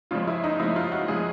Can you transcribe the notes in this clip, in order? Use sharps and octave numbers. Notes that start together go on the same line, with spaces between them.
C#2 C#3 F3 G#3 F4
E4
D#4
C#2 C#3 F3 G#3 E4
F4
F#4
C#3 F3 G#3 G#4